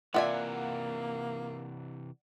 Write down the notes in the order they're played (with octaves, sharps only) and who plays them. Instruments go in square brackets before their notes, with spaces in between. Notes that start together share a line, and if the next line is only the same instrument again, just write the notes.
[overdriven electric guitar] C3 E3 [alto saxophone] A#3 [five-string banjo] F4 E5 G#5 [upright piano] D5 F#5